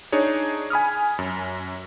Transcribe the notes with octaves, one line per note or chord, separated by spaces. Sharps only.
D4 D#4 G#4 C#5
G#5 B5 D#6 F6
F#2